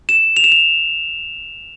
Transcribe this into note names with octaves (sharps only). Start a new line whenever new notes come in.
E7
F7
E7
F7